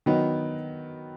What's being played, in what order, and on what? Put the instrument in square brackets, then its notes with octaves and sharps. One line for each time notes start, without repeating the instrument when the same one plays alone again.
[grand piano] D#3 F#3 B3 D#4